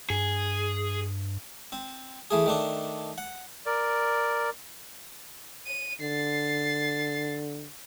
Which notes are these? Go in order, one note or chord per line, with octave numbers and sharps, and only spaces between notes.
G2 G#4
C4
E3 A3 G#4
D#3 A3 D4
F#5
A#4 D5
D#7
D3 A6 C7